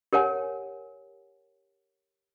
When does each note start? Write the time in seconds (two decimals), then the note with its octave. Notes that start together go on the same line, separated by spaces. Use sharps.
0.13 G4 A#4 C#5 F#5 G#5